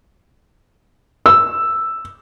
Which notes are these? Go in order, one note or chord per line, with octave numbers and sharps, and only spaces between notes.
E6